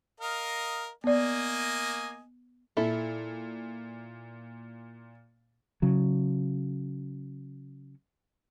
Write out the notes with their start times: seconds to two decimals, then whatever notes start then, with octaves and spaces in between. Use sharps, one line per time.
0.20 A#4 D#5 F5
1.04 A#3 B3 D5 D#5 G#5
2.77 A#2 E4 A4
5.82 C#3 F#3